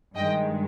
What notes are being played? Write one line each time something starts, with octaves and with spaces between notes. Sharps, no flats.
G2 D#3 G#3 D#5 G5